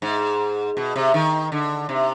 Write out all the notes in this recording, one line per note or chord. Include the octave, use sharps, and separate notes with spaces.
G#2
B2
C3
D#3
D3
C3